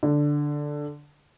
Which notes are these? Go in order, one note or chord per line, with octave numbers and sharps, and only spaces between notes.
D3